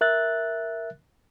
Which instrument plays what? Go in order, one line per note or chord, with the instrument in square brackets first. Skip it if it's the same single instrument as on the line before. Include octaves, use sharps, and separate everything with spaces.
[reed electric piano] A#4 E5 F#6 A6